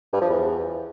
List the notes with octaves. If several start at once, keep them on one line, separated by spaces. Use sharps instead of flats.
G2
F3
E2